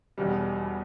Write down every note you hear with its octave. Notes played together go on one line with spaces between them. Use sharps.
E1 E2 B2 G3